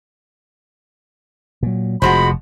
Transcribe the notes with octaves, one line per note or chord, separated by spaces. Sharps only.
A#2 F#3
F1 F3 G#3 F#4 B5